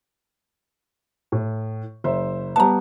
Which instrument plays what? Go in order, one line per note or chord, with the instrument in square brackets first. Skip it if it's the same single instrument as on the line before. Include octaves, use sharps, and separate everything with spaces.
[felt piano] A2
F#1 C5 E5
[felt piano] G3 B3 [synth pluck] A5 A#5